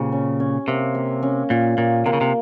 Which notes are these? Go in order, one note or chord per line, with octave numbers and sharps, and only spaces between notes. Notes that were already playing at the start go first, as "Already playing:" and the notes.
Already playing: A#2 C#3 G4 C5
C#4
C#4
C3 A#3
A#3
C#4
A#2 F4
A#2 A#3
C3 A#3
C#3
C3